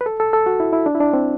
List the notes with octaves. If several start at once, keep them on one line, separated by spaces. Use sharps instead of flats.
B4
A4
A4
A4
F#4
E4
E4
D4
E4
D4
C4